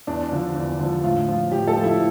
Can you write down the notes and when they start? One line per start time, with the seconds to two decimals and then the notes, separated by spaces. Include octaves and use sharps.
0.07 E2 D4
0.32 D3 F3
0.56 E2
0.79 D3 F3
1.04 A2 F4
1.28 F3
1.52 A2 G4
1.67 A4
1.76 F3
1.84 E4